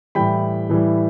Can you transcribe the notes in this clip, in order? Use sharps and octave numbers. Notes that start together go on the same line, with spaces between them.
A2 E3 G3 G5 B5
A2 E3 G3